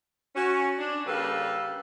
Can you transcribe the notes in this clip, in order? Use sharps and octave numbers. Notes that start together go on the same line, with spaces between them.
C#4 F#4
D4
C#3 G3 A#3 A4 B4 F5